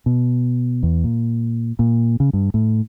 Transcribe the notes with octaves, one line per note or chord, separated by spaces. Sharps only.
B2
E2
A#2
A#2
C#3
G2
A2